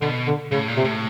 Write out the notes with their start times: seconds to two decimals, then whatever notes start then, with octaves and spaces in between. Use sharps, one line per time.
0.01 B2 D3
0.27 D3
0.51 A2 C#3
0.68 A#2
0.77 C3
0.84 A2